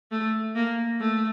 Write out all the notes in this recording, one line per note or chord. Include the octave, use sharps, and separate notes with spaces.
A3
A#3
A3